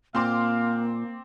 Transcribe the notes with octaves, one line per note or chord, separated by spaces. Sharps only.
A#2 A#3 C4 F5 C6 D6